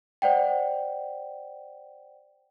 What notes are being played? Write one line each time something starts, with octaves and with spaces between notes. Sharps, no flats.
C5 D5 F#5 G5